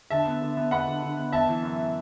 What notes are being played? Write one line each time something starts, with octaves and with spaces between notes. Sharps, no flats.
D3 E5 A5
B3
D3
B3
B3 F#5 B5
D3
D3
B3
B3 E5 A5
E3
F#2